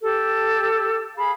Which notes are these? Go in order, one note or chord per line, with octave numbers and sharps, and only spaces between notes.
G4 A4
G#4 F5 B5